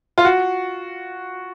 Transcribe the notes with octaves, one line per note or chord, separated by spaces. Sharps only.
F4
F#4